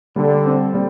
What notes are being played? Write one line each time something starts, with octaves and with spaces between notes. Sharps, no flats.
D3 G3
C4
G3